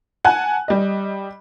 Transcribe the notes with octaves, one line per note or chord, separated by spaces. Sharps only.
F#5 G#5 A5 F#6
G3 D#5